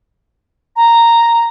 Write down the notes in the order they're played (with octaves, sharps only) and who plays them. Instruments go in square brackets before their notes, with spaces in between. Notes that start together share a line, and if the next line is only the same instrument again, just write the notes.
[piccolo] A#5